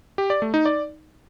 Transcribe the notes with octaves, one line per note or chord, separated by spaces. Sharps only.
G4
D5
A3
D#4
D5